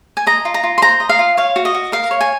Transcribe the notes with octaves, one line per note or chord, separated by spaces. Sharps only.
G#5
D#5 A#5
F4
A#5
F4
C6
C5 A#5
D#5
F5
F4
C#5 F5
F#4
D#5
F#4
A#4 F5
C#5
G#5